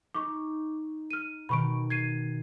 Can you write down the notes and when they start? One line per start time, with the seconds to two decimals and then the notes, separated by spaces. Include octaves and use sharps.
0.14 D#4 C#6 D6
1.11 F6 D#7
1.49 B2 D#3 B5 C#6 D7
1.90 G#6 C7 D#7